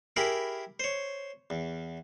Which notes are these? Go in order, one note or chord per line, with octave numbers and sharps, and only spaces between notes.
E4 G4 G#4 A#4 B5
C5 C#5
E2